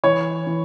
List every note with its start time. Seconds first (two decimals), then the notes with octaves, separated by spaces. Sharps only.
0.03 E3 C#5
0.47 E3